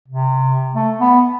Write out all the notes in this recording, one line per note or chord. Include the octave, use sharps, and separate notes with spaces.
C3
A3
B3